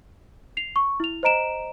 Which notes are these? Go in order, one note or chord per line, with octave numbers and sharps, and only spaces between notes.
C7 F7
C#6
E4 F7
C5 D#5 A#5 D7 E7